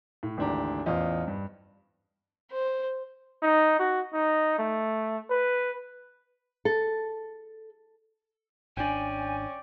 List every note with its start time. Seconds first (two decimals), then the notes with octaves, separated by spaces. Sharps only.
0.23 A2
0.37 G#1 D2 E3 D4 G4 A#5
0.86 A1 E2 F4 C5 D#5
1.28 G2
2.52 C5
3.42 D#4
3.79 F#4
4.13 D#4
4.59 A3
5.30 B4
6.65 A4
8.77 G#1 C#4 D4 D5 G5 G#5